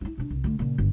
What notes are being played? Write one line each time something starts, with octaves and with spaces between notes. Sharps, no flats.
D#4 E4
B2 D4
C2
D3 A3
A#2 C#3
G1 D#3